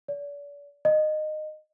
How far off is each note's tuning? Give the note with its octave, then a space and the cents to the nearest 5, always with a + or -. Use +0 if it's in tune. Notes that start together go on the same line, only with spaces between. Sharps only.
D5 -40
D#5 -20